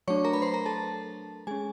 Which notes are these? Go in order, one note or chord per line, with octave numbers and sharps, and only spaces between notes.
F#3 A3 D4 C#5 C#6
A#4 A#5
B4 B5
C5 C6
A#4 A#5
A4 A5
G#3 C#4 G#4 G#5